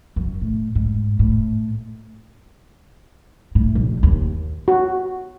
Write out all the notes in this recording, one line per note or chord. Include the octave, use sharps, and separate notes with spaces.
F#2
A2
G#2
A2
A2
A#1
D#2
F#4